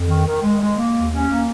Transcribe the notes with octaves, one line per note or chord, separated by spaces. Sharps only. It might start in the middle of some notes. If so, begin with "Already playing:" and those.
Already playing: F2
D#3
D#3
G#3
G#3
A#3
D#2
C#4
A#3